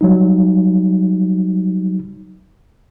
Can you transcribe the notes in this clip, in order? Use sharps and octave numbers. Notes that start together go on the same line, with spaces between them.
F#3 G3 D#4